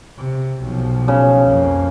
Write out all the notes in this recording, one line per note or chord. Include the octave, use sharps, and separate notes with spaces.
C3
B1 F3
C#3
F2 A#3